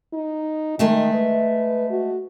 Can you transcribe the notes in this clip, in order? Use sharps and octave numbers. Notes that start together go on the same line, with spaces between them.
D#4
D#3 G#3 A3 E5
B4
F#4